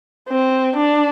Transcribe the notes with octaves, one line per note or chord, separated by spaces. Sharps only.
C4
D4